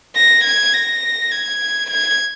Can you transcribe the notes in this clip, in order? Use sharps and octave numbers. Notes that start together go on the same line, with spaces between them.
A#6
G#6
A#6
G#6
G#6